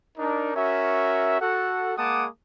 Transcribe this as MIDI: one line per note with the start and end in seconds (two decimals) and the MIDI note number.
0.18 0.53 62
0.18 0.53 63
0.18 0.53 70
0.55 1.38 61
0.55 1.38 66
0.55 1.38 70
0.55 1.38 76
1.41 1.93 66
1.41 1.93 69
1.41 1.93 78
1.97 2.26 56
1.97 2.26 58
1.97 2.26 78
1.97 2.26 81
1.97 2.26 86
1.97 2.26 87